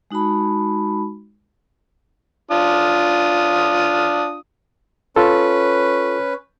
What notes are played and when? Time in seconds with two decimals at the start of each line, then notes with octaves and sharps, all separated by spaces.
0.11 G#3 D#4 F#4 A5 B5
2.51 D4 F4 D#6
5.16 C#4 F4 A4 B4